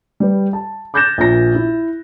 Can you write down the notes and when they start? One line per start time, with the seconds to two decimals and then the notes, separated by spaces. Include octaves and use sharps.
0.20 G3 B4
0.53 A5
0.94 D6 F#6 G6 A6 A#6 E7
1.18 A#1 A#2 A#6
1.55 E4